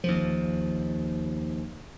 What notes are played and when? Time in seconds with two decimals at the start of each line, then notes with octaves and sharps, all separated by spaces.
0.04 D#2 F3